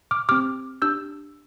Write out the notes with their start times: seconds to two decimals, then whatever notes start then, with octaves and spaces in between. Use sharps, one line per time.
0.11 D6 F6
0.29 C4 G4 D6 F6
0.82 D4 G4 E6 G6